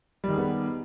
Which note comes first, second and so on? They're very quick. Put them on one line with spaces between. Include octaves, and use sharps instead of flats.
G3 D#3 G#4 B3